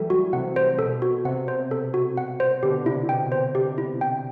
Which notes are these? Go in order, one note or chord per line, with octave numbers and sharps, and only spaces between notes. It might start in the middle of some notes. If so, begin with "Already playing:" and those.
Already playing: E3 F#3 G3 A3 A4
F#4
C3 F#5
C5
B2 A4
F#4
C3 F#5
C5
A4
F#4
F#5
C5
B2 D3 G4
C3 E4
B2 G5
B2 C5
C3 G4
E4
G5